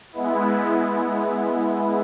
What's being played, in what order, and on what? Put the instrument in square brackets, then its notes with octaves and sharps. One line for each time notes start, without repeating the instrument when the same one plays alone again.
[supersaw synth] G#3 B3 E4